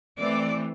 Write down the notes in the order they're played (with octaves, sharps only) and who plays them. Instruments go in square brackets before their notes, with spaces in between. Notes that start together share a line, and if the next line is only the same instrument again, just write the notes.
[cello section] E3 A3 C4 D5